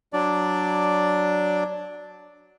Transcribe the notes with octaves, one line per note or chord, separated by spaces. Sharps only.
F#3 D4 D5